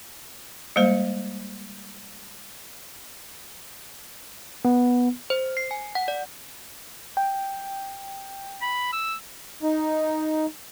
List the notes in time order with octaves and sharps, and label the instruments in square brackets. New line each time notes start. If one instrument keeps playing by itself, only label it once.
[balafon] G3 G#3 A#3 C5
[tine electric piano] B3
[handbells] C5
C7
G#5
F#5
D5
[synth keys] G5
[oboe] B5
E6
[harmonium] D#4